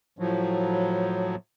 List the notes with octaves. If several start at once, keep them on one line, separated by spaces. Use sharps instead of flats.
A2 F3 F#3